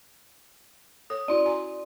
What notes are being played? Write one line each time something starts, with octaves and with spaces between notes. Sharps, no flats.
A4 C#5 D#6
C#4 E4 F#4 D5 C6
F#4 G#5 A#5